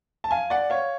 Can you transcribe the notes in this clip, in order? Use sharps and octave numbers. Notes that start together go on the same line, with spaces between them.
A5
F5 G#5
D5 F#5
C#5 F5